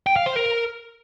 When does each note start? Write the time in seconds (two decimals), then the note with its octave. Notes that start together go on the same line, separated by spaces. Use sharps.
0.07 G5
0.16 F5
0.26 C5
0.36 A#4